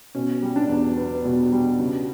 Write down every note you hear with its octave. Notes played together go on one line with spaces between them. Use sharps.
B2 C#4
G3
D4
E2
B3
B2
G3
C#3